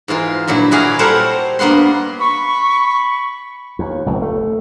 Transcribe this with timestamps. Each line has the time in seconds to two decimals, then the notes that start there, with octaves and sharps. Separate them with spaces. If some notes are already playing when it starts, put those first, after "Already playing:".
0.08 G#2 E3 F4 A#4
0.48 G2 A#2 F#3 E4
0.71 E4 F#4 G#4 D5 F5
0.99 G3 A4 A#4 C5 C#5 F#5
1.59 G2 A#3 B3 F#5 C6
2.20 B5 C#6
3.79 D#2
4.06 F1 C#2
4.22 A3